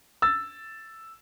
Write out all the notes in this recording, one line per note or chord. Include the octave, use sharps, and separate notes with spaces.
E6 A6